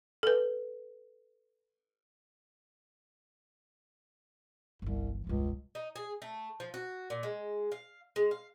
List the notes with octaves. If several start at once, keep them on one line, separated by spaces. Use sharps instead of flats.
A4 B4
G1 C2 E3
E1 C#2 G2
D#4
G#4
A3
F3
F#4
A#2
G#3
F5
G#3
F5